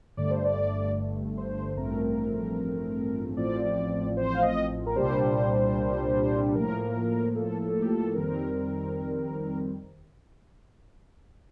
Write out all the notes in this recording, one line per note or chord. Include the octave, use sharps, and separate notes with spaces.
G1 G2 D3 A3 D5
C5
D5
C5
A1 G2 F3 A3 C4 A#4
A1 A2 F3 C4 D5
C5
F5
D#5
A#4
C2 A#2 G3 D4 C5
A2 F3 A#3 A#4
A4
A4
G4
A4
F2 D#3 G3 C4 A#4